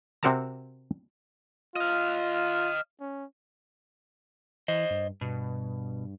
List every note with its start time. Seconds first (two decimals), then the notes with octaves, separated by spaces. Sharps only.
0.23 C3 C4 F#4 A#4 A5 A#5
1.76 F4 D#5 F5
3.00 C#4
4.68 E3 C5 D#5
4.91 G2
5.21 G2 B2